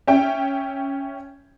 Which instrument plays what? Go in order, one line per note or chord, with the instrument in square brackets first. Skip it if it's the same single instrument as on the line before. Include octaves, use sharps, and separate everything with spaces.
[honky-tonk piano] C#4 E5 G5